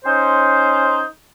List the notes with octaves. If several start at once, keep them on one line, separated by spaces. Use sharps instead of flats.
C#4 D#4 C5